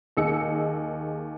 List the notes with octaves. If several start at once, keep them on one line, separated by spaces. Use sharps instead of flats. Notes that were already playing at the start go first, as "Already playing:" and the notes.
D#2 G#4 D#5 E6 C#7